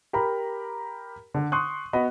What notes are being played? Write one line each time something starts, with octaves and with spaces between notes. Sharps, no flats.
G4 A#4 A#5 B5
D3
C6 C#6 D#6 F#6
B3 F#4 D#5 B5